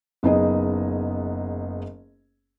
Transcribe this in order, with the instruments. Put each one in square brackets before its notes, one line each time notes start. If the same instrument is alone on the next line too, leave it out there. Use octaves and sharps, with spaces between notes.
[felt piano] F#1 B3 D#4 G#4 D#5